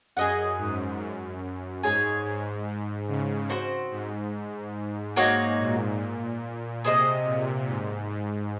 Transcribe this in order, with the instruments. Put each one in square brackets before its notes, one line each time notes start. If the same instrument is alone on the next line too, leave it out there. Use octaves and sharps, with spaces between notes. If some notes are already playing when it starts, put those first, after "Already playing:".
[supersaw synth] F#2 [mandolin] G#4 D#5 F#5
[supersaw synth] G#2
F#2
[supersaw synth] G#2 [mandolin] G#4 C#5 G#5
[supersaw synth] G#2
G#2
C#3
[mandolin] C4 F#4 C5
[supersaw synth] G#2
[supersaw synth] G#2 [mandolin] A#3 D#4 F#4 C#5
[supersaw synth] A#2
[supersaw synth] C3 [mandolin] G#4 C5 D#5
[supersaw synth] A#2
G#2
G#2